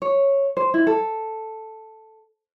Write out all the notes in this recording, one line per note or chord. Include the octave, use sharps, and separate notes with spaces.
C#5
C5
E4
A4